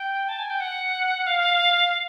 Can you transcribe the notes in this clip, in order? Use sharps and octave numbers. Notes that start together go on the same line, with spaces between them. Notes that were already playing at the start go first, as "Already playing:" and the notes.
Already playing: G5
A5
G#5
G5
F#5
F5